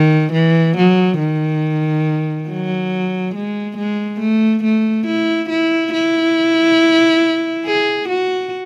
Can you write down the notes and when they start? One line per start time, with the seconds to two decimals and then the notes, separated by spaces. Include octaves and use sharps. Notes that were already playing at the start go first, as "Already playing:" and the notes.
Already playing: D#3
0.33 E3
0.77 F#3
1.19 D#3
2.49 F#3
3.35 G#3
3.77 G#3
4.20 A3
4.64 A3
5.07 E4
5.50 E4
5.93 E4
7.65 G#4
8.08 F#4